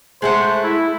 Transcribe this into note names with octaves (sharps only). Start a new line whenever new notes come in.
G#3 A3 C5 F#5
E4